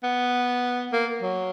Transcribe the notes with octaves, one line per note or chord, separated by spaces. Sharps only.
B3
A#3
F#3